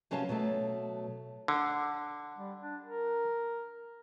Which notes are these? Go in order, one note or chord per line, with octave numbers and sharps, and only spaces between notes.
C3 F#3 C#4 B4 F5 A5
B2 F#3 A3
D3
G3
D4
A#4